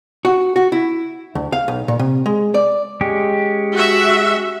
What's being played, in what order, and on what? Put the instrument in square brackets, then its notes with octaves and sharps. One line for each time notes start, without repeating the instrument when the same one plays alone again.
[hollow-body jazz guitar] F#4
F#4
E4
D2
F5
B1
A#2
C3
G#3
D5
[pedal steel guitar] G#3 C#4 G4
[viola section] F#4 E5